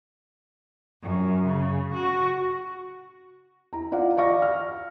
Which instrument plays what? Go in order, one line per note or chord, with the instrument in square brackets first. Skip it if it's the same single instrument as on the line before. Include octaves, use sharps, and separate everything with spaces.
[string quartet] F#2
C#3
F#4
[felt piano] E4 A#5
F4 D5 F5 F#5
D5 F5 C#6 A#6
F6